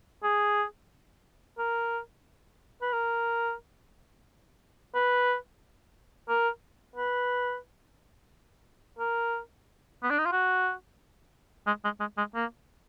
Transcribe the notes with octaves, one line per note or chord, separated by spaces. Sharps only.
G#4
A#4
B4
A#4
B4
A#4
B4
A#4
B3
D4
D#4
F4
F#4
G#3
G#3
G#3
G#3
A#3